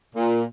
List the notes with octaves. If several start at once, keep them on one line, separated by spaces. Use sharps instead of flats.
A#2